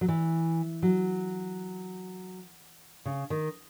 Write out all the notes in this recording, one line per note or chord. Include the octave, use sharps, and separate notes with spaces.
F#3
E3
F#3
C#3
D#3